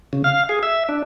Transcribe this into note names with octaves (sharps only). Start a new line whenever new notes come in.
C#3
F5
G#4
E5
D4